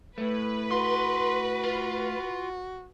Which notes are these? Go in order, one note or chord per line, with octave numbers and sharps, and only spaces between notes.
A2 A3 B4
F#4 C6
F4